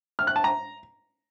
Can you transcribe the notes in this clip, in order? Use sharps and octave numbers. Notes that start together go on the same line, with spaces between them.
F6
F#6
A5
A#5